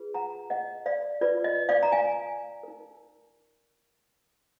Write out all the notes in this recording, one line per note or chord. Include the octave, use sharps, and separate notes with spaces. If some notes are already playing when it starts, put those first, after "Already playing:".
Already playing: F4 G#4 B4
F#5 A#5
D#5 F#5
D5 F5
F4 B4 D5
D#5
D5 F5
A#5
F5 G#5
D#4 A#4